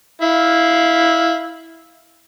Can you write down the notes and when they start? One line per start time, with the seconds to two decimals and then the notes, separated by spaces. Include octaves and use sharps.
0.22 E4 F5